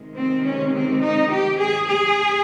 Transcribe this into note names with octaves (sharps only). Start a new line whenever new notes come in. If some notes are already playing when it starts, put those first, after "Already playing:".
Already playing: C3 D#3 G#3
C4
C#4
C4
D#4
G4
G#4
G#4